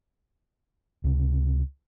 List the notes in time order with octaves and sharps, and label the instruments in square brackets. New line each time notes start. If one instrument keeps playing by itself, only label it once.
[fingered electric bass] C#2 C3